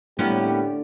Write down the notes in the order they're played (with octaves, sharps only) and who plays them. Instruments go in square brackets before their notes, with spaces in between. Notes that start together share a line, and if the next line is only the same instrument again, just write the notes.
[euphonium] A2 [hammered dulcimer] D3 [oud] A#3 B3 C#4 [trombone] G4